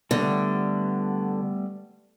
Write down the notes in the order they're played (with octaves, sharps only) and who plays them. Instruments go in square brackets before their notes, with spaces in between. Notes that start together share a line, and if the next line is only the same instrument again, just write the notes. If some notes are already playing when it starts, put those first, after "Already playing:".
[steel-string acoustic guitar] D3 [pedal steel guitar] G3 A3 B3